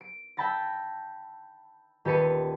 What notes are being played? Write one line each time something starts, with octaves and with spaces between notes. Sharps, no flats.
D7
E5 G5 A5 B5 A6 A#6
D#1 G4 A4 B4 C#7 D#7